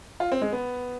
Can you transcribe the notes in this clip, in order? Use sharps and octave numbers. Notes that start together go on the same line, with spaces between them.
F4
C4
G#3
B3